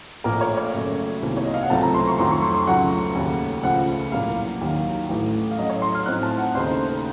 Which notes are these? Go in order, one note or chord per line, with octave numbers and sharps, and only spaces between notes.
A#1 A#2 F3 A3 A#4
C#5
C#5
F#2 C#3 A3
C2 C3 D#3 A#3
C#5
D#5
F5
F#5
C#2 C3 F#3 A3 C4 A5
A#5
C6
C#6
F2 D#3 F#3 A3 C6
C#6
C6
C6
C#2 C#3 F#3 A3 F#5
D#2 C#3 A3 C#4
C#2 C#3 F3 A3 F#5
C2 A#2 F#3 A#3 F5
D#2 D#3 F#3
A1 A2 A3
F5
A2 F#3 A3 C#4 D#5
C#5
C6
F6
A2 F3 C4 D#4 F#6
A5
F#5
D#2 C#3 A3 D#4 C5